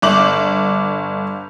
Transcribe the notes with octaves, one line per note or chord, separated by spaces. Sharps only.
G1 D6 F#7